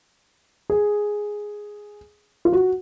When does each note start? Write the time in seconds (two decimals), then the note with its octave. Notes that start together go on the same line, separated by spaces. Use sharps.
0.70 G#4
2.45 F4
2.53 F#4